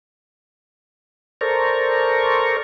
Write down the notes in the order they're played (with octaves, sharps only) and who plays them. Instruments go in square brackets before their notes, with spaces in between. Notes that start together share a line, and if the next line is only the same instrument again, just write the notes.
[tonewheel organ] A4 A#4 C5 D5 A#5 C#6